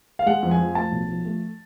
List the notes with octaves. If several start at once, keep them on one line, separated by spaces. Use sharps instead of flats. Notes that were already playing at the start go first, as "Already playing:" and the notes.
F5
G#3 F#5
F2
G#5
F3
A3 A5
B1
F3
A3